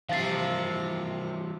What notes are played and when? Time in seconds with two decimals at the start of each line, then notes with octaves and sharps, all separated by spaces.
0.09 C3 E3 F3 G3 F5 A6 C7